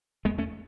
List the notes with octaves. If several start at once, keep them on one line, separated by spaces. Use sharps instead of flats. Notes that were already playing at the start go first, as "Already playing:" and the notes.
E2 G#3 B3
A3 C#4